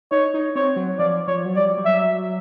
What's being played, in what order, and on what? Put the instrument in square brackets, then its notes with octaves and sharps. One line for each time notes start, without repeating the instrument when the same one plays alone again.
[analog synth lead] D#4 [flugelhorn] C#5
[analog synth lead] D#4
[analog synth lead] C4 [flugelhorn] C#5
[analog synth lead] F#3
[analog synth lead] F3 [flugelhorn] D5
[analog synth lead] F3 [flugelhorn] C#5
[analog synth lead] F#3
[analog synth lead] G3 [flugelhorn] D5
[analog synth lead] G3
[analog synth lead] F#3 [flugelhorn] E5